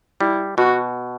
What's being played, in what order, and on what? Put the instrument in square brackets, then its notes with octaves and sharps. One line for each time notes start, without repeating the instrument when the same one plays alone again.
[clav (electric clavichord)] G3 [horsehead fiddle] E4
[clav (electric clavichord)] B2 [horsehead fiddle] F#4